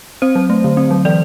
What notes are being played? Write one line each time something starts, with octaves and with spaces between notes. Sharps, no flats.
C4 C5
F#3
A3
D3
C4
F#3
E3 D5